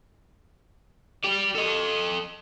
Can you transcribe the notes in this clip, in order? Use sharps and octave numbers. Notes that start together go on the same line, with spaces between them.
G4 D5
A4 D#5